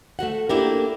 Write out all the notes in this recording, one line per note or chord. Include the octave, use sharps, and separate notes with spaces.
A3 A#3 F#4 F#5
A#3 D4 E4 G4 A4 A#4